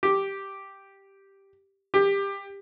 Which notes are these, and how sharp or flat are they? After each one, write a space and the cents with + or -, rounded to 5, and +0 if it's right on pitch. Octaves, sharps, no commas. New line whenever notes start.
G4 +0
G4 +20